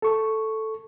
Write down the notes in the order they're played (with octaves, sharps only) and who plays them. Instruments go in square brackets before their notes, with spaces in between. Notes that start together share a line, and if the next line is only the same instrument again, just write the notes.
[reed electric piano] A4 C#6